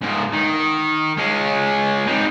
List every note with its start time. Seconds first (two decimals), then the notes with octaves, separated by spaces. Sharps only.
0.02 G#2 C#3
0.32 D#3
1.17 G#3 C#4
2.07 C4 D#4